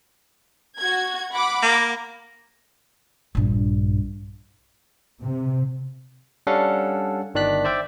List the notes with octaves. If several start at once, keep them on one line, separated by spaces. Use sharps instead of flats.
F#4 G#6
F#5 B5 D6
A#3
A#1 G2
C3
G3 C#4 D4 A4 F5 F#5
G1 D#3 D4 D5 F#6 B6
C5 D5 E5 G5